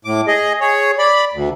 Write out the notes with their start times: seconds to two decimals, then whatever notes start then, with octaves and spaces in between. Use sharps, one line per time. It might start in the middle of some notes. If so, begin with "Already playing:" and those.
0.05 A2 D6
0.28 G#4 D#5
0.61 G#4 C#5
0.99 D5 B5
1.33 D2